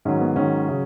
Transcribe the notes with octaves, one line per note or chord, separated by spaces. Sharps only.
G#2 D#3 F#3 C#4
B3
G#2 D#3 F#3 C#4
C#3 F#3